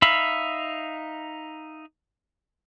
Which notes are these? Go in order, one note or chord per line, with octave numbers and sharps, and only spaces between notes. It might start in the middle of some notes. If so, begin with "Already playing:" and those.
D#4 E5 F5 B5